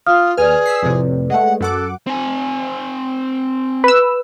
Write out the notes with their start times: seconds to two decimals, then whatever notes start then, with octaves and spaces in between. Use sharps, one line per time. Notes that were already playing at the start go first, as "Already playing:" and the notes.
0.07 F4 F5 D#6 F6
0.37 D#2 G#4 B4 D5 G#5 F6
0.66 E6 B6 C7
0.83 F2 A2 C3
1.30 G#3 A3 F#5
1.61 F#2 A4 F#5 D6
2.07 C4 G#5
3.84 B4 E6